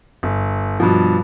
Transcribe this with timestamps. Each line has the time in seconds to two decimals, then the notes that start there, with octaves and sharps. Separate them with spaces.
0.23 G1
0.80 G2 B2 F3